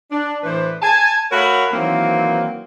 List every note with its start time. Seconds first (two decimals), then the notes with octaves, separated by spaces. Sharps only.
0.11 D4
0.43 A2 E3 D4 B4 C5
0.82 G#5 A5
1.31 A3 F#4 A#4 C#5 F5 B5
1.73 D#3 E3 F#3 A#3 C4